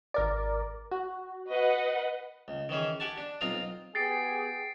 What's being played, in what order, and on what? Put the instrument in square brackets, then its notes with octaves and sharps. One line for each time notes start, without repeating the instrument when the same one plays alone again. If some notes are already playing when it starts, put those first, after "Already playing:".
[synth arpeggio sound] G#1 A#4 D5
F#4
[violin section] B4 D#5 F#5
[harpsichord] C#2
D#3 E3 C#4 G#4
G4 F#5 G#5 A5
D4
B1 C4 F4 C5 A#5 D#6
[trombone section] B3 G4 G#4 [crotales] A6 C7 D7